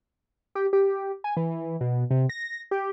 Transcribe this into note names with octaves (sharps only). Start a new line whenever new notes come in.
G4
G4
G#5
E3
B2
C3
A#6
G4